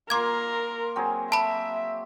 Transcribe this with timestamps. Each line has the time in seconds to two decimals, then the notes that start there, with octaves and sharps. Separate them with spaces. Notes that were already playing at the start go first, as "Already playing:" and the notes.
0.10 A#3 F4 A#4 C6 D6 G#6
0.96 F#3 C4 G#4
1.32 E5 A5 B5